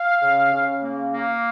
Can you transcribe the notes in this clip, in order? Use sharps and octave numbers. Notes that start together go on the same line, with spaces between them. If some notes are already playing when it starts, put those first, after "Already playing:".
Already playing: F5
C#3
C#3
A#3
A#3